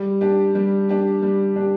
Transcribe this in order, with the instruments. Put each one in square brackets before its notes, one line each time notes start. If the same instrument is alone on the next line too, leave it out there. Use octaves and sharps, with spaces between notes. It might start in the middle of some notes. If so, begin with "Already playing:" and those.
Already playing: [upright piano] G3
D4 G4
G3
D4 G4
G3
D4 G4